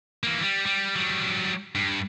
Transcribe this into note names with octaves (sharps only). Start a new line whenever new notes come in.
E3 A#3
G3
G3
F#3 G3
G2